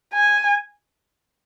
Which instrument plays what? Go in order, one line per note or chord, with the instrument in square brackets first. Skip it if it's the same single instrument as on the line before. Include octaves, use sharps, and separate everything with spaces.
[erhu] G#5